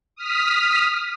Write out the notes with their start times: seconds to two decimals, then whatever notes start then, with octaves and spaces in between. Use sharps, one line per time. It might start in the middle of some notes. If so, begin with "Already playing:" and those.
0.16 D#6 F6 B6